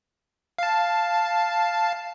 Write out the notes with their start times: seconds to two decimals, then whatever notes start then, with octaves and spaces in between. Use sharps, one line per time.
0.58 F5 A5